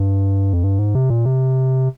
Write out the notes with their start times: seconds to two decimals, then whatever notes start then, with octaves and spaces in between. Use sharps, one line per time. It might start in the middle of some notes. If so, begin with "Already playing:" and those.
Already playing: G2
0.53 F2
0.64 G2
0.79 G#2
0.95 C3
1.10 A#2
1.25 C3